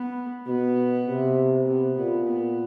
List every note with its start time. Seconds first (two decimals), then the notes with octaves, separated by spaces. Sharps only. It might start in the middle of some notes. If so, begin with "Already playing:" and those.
Already playing: B3
0.47 B2 B3
1.06 C3
1.66 C3 B3
1.96 A#2 B3
2.27 B3